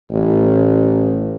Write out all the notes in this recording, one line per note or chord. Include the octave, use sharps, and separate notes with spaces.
A1